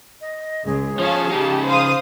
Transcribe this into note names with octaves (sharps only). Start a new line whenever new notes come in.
D#5
C#2 G#4
F3 C#4 C#5 F5 A5
C#3 D#4 G4 A5
C5 F5 D#6